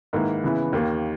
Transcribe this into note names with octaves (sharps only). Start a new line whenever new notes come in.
G#2 D#3 A#3 E4 B4
C#3 E3 B3 E4
D#2 D#3 A#3